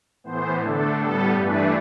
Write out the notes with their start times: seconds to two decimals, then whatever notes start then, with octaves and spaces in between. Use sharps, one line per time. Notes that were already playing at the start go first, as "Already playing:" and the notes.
0.24 A2 E3 B3 C5
0.62 D3 A3 D4 A4
0.98 A2 G3 B3 A4
1.35 G2 E3 A3 D4 B4